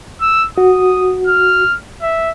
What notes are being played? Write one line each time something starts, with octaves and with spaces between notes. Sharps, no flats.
E6
F#4 D#6
F6
E5